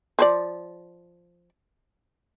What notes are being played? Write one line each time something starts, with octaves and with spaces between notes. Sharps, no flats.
F3 C5 D5